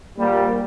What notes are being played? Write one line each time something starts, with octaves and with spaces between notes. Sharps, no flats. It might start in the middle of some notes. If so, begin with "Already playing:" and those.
A#1 A#2 G3 A#3